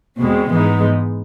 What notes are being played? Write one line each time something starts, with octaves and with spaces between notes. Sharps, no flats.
E2 B2 G#3 C4
G#2 E3 G#3 B3 D#4